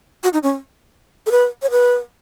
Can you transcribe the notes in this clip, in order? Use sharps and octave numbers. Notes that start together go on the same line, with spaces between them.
F#4
D#4
C#4
A4
B4
C#5
B4